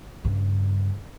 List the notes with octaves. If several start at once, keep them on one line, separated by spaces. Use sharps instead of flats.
G2 C#3